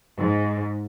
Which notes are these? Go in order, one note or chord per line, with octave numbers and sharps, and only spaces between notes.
G#2